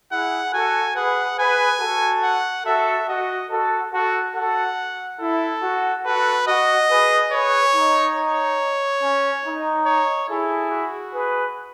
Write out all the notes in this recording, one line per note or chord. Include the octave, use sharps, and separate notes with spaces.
E4 G#4 F#5
F#4 A4 G#5
G#4 B4 F#5
G#4 B4 G#5
F#4 A4
F#5
F#4 A4 E5
F#4 D#5
F#4 A4
F#4 A4
F#4 A4 F#5
E4 A4
F#4
F#4 A4 B4
F#4 D#5
G#4 B4
G#4 B4 C#5
D#4
C#5
C#4
D#4
C#5
E4 G#4 A4
F#4
G#4 B4